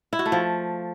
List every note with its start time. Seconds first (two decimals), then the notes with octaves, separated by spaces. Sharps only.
0.13 E4
0.19 F#4
0.26 A3
0.32 F3